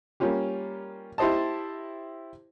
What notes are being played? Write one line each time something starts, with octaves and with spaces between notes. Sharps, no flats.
G3 A#3 C#4 F4 G4
E4 G4 C5 D#5 A5